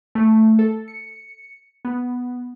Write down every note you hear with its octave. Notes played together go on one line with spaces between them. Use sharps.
A3
A4
C#7
B3